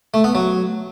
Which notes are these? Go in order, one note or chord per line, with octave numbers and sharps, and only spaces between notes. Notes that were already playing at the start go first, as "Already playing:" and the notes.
A3
B3
F#3